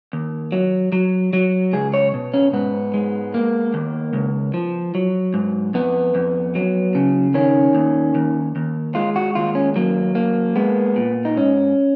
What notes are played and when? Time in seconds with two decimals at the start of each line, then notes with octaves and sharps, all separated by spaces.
0.13 D#2
0.52 F#3
0.92 F#3
1.33 F#3
1.73 C#2 G#4
1.94 C#5
2.14 B2
2.34 C#4
2.53 G#2 B3
2.94 G#3
3.34 A#3
3.74 D#2
4.13 C#2
4.54 F3
4.95 F#3
5.34 G#2
5.74 F2 B3
6.15 F2
6.55 F#3
6.95 C#3
7.34 D#3 C#4
7.75 D#2
8.15 D#2
8.56 D#2
8.95 G#3 F4
9.16 F#4
9.35 D#2 F4
9.55 C#4
9.76 F#3 A#3
10.15 A#3
10.56 G#3 B3
10.96 A#2
11.25 D#4
11.36 G#2 C#4